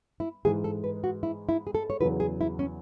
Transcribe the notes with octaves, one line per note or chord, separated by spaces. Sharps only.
E4
G#2 E3 G#3 G#4
A4
B4
F#4
E4
E4
G#4
A4
C#5
E2 C#3 F#3 B4
G#4
E4
C#4